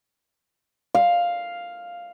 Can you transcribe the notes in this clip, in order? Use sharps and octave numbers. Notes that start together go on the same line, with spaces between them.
F5